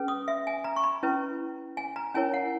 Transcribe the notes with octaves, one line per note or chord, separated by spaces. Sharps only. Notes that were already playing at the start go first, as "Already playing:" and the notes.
Already playing: C#4 G#4 B4
D#6
E5
G#5
A#5
C#6
B5
C#4 E4 B4
G#5
A#5
C#4 E4 A#4 C#5 G#5
F#5